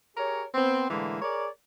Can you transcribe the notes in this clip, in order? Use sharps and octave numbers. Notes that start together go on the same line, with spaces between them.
G4 G#4 A#4 C#5
B3 C4
A2 D3 E3 G#3 A#3
G#4 A#4 C#5 D5